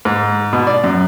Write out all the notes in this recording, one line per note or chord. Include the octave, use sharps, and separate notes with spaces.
G#2
B2
D5
F#2